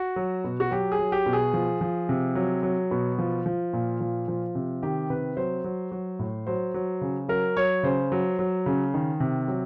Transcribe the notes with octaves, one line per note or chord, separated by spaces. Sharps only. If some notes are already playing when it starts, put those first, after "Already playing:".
Already playing: F#4
F#3
B2
F#4
F#3 G4
G#4
F#3
G4
B2
G#4
F3
F3
C3
F#3
F#3
B2
F3
F3
A#2
F3
F3
C3
D#3 G4
C3 B4
F#3 C5
F#3
F#3
A2
F#3 C5
F#3
C#3
F#3 A#4
F#3 C#5
C#3 C5
F#3
F#3
C#3
D#3
C3
F#3